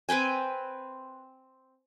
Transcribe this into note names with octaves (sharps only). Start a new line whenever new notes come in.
C4 B4 G5 G#5